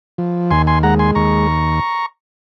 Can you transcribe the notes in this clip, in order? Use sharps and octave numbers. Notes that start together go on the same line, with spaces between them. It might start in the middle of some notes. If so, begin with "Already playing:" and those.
F3
D#2 G#5 C6
G#5 C6
G#3 F#5 A#5
G#5 C6
D#2 A#5 C#6